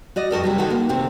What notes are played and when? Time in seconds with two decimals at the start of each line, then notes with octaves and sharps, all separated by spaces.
0.16 F#4 D5 D#5
0.31 F2 F#4 A4 A#4
0.44 C3 F#3 G3
0.58 D3 D#3 F#4 A4
0.70 A#3
0.89 D2 C3 C4